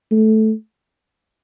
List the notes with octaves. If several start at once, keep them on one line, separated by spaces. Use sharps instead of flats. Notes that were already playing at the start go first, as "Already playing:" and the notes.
A3